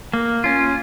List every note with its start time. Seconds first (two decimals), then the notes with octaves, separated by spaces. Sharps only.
0.13 A#3
0.44 C#4 F4